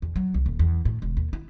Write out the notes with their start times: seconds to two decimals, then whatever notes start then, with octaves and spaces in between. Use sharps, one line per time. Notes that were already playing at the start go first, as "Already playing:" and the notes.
0.02 E2
0.16 F#3
0.34 C2
0.46 D#1
0.59 E2
0.85 A2
1.02 E1
1.17 D#2
1.33 E4